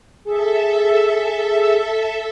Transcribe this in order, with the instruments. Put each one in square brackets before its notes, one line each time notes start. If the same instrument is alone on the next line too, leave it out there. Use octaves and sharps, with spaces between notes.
[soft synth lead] G#4 [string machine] A4 E5